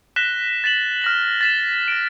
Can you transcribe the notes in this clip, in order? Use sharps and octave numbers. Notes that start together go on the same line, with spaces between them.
F#6 A#6 B6 E7 G7
A6 B6 E7 F#7
F6 A#6 F#7
A6 B6 E7
A#6 D7